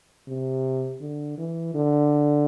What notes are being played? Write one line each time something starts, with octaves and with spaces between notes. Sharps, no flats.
C3
D3
E3
D3